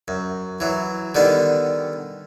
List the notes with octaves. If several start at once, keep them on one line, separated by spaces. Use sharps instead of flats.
F#2
E3 F#3
D3 D#3 G3 B3